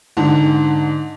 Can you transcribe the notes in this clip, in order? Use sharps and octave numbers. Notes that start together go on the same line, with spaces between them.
G#2 D3